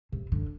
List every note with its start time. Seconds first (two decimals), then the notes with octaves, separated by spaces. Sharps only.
0.12 C3
0.32 D3